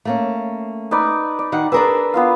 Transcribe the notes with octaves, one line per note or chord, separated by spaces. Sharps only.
A3 A#3 C#4
D#4 B4 D5
D5
D#3 D#4 F#5
D4 G#4 A#4 B4 E6
B3 F4 F5